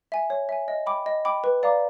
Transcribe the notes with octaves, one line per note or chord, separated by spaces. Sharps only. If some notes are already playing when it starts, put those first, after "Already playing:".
E5 G#5
C#5
E5 G#5
D#5
G5 B5 D6
D#5
G5 B5 D6
B4
D5 F5 A#5 D6